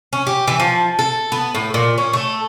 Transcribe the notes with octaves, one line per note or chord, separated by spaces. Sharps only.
C#4
G4
E3
F3
A4
B3
A2
A#2
C#4
A3